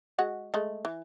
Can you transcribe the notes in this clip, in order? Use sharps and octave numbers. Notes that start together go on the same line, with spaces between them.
G#3 F#4 F#5
G#3 A3
E3